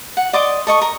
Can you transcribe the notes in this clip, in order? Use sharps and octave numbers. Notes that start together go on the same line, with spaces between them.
F#5
D5 D#5 C6 D6
A4 D#5 C#6
A#4